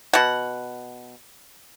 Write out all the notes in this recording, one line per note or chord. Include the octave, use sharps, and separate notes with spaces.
B2 F#5